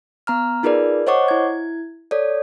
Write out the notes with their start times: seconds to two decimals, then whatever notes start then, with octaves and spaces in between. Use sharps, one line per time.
0.27 B3 A#5 F6
0.63 D#4 F4 G#4 A#4 B4 D5
1.07 C5 C#5 D#5 F#5 C#6 D6
1.28 E4 G#6
2.11 A4 C#5 D5